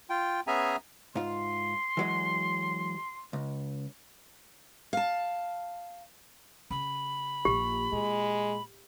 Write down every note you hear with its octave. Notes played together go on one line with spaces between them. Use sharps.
F4 G5
B3 C#4 G#4 E5 G#5 A#5
G#2 F4 C6
E3 F#3 G#3
C#2
F5 A5
C#3 B5
A#1 A#3 G4
A#2 G#3